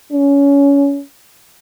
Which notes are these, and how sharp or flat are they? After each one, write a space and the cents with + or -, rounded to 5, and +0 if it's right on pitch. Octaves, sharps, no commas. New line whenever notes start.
C#4 +20